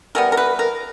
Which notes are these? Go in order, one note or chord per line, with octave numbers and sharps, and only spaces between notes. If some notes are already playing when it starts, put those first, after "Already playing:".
E3 G3 B3 A#4
A#4
B4
A#4